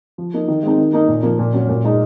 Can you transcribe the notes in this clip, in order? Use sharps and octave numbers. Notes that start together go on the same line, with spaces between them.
F3
A#3 D#4
D#3
G#3 C4 D#4
D#3
A#3 D#4
A#2
F3 A#3
A#2
F#3 C#4
A#2
G#3 D#4